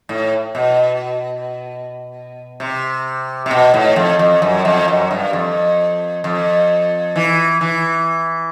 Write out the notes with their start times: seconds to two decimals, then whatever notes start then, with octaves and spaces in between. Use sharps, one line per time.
0.09 A2
0.55 B2
2.60 C3
3.46 C3
3.51 B2
3.74 A2
3.96 F2
4.19 F2
4.42 F#2
4.65 F2
4.88 F#2
5.11 G2
5.33 F2
6.24 F2
7.16 E3
7.61 E3